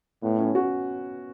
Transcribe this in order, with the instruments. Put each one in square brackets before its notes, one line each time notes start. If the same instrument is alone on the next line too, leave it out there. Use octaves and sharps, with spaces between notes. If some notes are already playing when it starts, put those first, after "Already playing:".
[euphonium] A2 [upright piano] B3
[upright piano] C#4
F#4